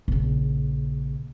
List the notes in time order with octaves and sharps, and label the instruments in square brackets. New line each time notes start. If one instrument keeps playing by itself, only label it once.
[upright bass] A#1 C#3